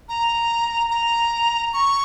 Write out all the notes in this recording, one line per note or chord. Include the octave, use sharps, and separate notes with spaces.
A#5
A#5
C#6